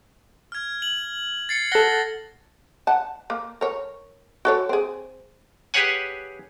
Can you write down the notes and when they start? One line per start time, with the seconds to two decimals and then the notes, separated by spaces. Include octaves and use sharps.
0.52 F6 G#6
0.82 F#7
1.49 A6 C7 C#7
1.72 A4 F#5 A#6 C#7 G7
2.87 F#5 A5
3.30 A#3
3.61 A#4 C#5
4.45 F#4 A4 C#5
4.69 C4 G#4
5.74 G4 G#4 B4 C#5 F#5 G#5